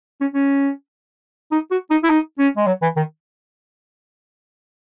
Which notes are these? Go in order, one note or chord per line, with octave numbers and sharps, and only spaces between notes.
C#4
C#4
D#4
F#4
D#4
E4
D#4
C#4
G#3
F#3
E3
D#3